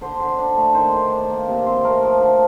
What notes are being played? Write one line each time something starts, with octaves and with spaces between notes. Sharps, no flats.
D3 C5
D3
D4
A3
D#3 C5
D#3
D4
A#3
C3
C4 C5
A3 A#4
F3
D3